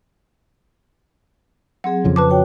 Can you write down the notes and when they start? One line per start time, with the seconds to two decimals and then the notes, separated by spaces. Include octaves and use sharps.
1.84 F#3 C4 G#4 F#5
2.04 F2 C#3 F3
2.16 B4 A5 D6
2.30 F#4 C#5 G5